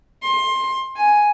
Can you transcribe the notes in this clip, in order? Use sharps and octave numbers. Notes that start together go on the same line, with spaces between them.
C6
G#5